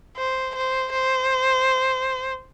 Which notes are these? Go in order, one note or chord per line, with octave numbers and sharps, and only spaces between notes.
C5
C5
C5